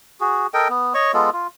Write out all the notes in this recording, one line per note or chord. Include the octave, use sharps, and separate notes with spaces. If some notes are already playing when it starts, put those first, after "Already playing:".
F#4 G#4
A4 A#4 D#5 G5
B3
C#5 D#5 C#6
G#3 B3 F4 A4
F4